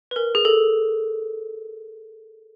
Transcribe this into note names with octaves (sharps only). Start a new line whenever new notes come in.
B4
A#4
G#4
A4